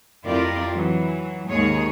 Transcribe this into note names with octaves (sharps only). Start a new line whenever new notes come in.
F2 E4 F4 G4 A#4 D5
E3 F#3
D#2 G#2 G#3 G#4 C#5